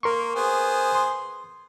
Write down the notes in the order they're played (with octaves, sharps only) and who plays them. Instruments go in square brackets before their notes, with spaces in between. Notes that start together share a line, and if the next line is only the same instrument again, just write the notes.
[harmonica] A#3 [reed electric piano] A#4 C6 C#6
[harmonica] B3 G#4 C5
[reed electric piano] C6